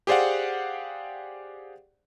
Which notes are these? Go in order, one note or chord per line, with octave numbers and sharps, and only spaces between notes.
G4 G#4 C5 D5 F5 F#5